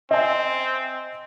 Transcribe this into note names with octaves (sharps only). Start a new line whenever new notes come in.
C4 D#5 E5 G#5